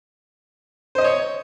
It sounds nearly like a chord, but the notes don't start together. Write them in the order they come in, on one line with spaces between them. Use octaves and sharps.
C5 D#5 D#6 C#5